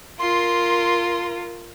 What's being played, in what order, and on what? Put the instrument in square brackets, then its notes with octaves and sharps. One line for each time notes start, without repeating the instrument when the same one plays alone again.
[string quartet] F4 A#4 [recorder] C6